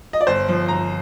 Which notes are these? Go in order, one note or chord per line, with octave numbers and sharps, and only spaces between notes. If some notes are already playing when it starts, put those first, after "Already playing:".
D#5
D5
G1 C5
F3
G1 A#5